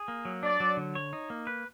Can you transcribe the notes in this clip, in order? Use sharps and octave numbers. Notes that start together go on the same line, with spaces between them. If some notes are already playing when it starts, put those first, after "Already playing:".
Already playing: G#4
A#3
F#3
D4 D5
F#3
D3
C#5
D#4
A#3
B4